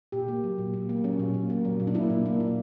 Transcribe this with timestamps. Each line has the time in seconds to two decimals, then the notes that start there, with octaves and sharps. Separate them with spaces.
0.12 A#2 G4
0.28 A#3
0.44 F#3
0.58 A#2
0.74 A#2
0.89 A#3
1.04 F#3 C#4
1.19 A#2
1.34 A#2
1.50 A#3
1.65 F#3
1.80 A#2
1.87 D4
1.94 A#3 E4
2.10 A#2
2.26 A#3
2.40 A#2